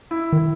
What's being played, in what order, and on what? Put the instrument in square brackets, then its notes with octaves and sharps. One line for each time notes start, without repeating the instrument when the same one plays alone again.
[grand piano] E4
[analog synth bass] D#3